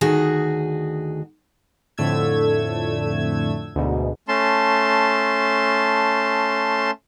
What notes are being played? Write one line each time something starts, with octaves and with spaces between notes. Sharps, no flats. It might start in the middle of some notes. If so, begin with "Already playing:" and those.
D2 D#3 F#4 G#4
F2 A2 D3 A3 E6 G#6
D2 G#2 B2
A3 C#4 A5 C6